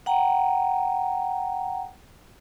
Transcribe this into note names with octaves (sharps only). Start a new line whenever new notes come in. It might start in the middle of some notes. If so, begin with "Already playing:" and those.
F#5 G5 A#5